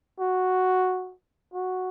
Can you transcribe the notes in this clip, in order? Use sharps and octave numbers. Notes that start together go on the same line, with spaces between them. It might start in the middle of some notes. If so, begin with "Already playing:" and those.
F#4
F#4